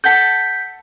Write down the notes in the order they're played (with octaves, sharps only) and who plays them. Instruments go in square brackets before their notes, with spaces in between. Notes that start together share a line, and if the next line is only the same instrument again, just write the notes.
[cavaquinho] A4 F#5 A5 [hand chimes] G6 B6